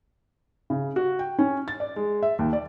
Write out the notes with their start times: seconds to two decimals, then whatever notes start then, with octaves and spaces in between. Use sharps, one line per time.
0.70 C#3
0.96 F#4
1.19 G5
1.39 C#4
1.68 A6
1.80 D5
1.96 G#3
2.23 E5
2.39 D#2
2.53 D5